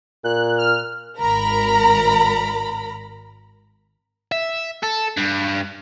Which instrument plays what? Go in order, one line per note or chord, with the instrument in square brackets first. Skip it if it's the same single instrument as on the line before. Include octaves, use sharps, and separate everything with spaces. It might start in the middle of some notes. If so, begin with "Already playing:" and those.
[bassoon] A#2 [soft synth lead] F#6
[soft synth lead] F6
[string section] G#1 A#4 A#5 B5
[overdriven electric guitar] E5
A4
G2